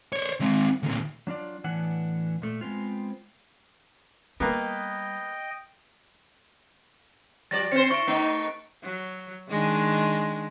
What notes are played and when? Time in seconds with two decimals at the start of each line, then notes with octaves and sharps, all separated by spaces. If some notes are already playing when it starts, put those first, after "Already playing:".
0.13 C5 C#5
0.41 G#3 C4
0.83 D2 A#2
1.27 F#3 D4 F4 D5
1.64 A2 E3 B3 D4 F#5
2.42 A#2 A3
2.61 G#3 B3 C4 F4
4.40 G3 A#3 B3 D#5 G5
7.51 F3 G3 D5 A6 A#6
7.72 C4 C5 C#7
7.91 E4 C#6 D7
8.07 A3 D#4
8.83 F#3
9.49 D#3 G#3 D4